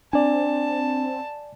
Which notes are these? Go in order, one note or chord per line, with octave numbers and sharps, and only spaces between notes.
C4 D4 D5 G#5 A5